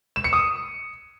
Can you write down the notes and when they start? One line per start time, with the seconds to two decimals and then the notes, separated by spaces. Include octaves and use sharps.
0.16 E7
0.24 C#7
0.33 D#6